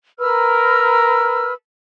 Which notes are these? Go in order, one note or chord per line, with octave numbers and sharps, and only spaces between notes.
A#4 B4 E6 F6